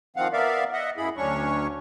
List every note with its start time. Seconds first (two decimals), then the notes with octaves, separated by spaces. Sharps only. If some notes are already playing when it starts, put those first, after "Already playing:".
0.16 D#3 F3 C4 F5 F#5
0.33 B3 A#4 D5 E5 F5
0.73 D#5 E5 F#5
0.97 F#2 E4 G#4 B5
1.17 D2 F#3 C#4 D4 C#5 C#6